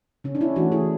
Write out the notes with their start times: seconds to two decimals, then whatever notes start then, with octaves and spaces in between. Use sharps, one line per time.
0.24 C#3 C#4
0.35 D4
0.41 C#4 E4
0.56 E3 A3 D4 F#4
0.72 E4 G#4